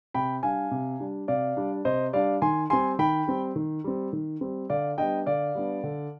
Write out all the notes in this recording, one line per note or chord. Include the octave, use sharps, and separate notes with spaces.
C3 G5 B5
G3 D4 F5 G#5
C3
G3 D4
C3 D5 F5
G3 D4
C3 C5 D#5
G3 D4 D5 F5
D#3 G#5 C6
G3 C4 G#5 C6
D#3 G5 B5
G3 C4
D#3
G3 C4
D#3
G3 C4
D3 D5 F5
G3 B3 D4 D#5 G5
D3 D5 F5
G3 B3 D4
D3